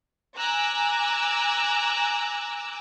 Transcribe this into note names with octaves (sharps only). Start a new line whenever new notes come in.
G#5 A#5 D6 E6 F#6